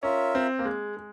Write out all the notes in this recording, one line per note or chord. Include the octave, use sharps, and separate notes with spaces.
C#4 F4 A#4 E5
C4
A#3
G#3
G#3